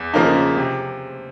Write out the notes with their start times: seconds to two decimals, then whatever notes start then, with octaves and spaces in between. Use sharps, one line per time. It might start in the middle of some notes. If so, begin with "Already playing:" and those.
Already playing: E2
0.14 C#3 F3 A#3 D#4
0.57 C3